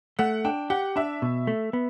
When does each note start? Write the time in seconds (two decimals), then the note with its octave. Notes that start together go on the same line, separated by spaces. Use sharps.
0.19 A3 F#5
0.45 D4 G5
0.70 G4 F#5
0.96 D4 E5
1.22 B2
1.47 A3
1.73 B3